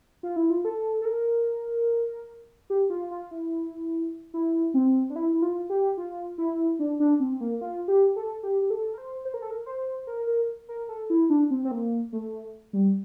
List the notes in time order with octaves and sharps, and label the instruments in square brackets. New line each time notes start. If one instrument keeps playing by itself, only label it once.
[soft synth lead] F4
E4
F4
A4
A4
A#4
G4
F4
F4
E4
E4
C4
D4
E4
E4
F4
G4
F4
E4
D4
D4
C4
A#3
F4
G4
A4
G4
G4
A4
A#4
C5
C5
A#4
A4
A#4
C5
A#4
A#4
A#4
A4
E4
D4
C4
C4
A#3
A3
G3